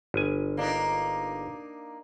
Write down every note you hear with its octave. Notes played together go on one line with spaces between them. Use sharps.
G1 G#5
A#3 D4 D#4